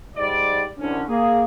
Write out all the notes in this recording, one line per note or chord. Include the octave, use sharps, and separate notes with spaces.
G#2 G3 D5
C2 D3 C#4
A#3 G#4